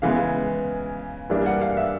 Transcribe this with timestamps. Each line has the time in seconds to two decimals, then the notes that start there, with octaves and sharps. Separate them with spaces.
0.02 C#3 E3 G#3 B3 F5
1.30 G2 E3 G3 A#3 D4
1.46 F#5
1.61 F5
1.77 E5